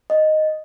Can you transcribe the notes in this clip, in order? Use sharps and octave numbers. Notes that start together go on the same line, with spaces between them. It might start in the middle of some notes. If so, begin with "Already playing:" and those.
D#5